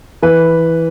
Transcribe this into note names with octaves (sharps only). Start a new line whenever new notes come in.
E3 B4